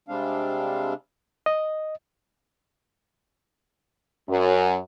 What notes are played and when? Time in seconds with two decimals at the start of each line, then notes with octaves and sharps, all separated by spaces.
0.08 C3 G3 G#3 C4 D4 F5
1.46 D#5
4.29 F#2